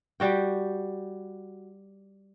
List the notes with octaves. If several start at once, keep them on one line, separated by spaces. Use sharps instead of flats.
G3 F#4 G5